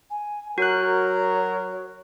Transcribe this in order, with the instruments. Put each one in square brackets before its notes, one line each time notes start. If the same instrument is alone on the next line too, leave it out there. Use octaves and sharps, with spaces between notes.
[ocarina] G#5
[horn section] F#3 A#4 [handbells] F#4 F#6 [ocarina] C#5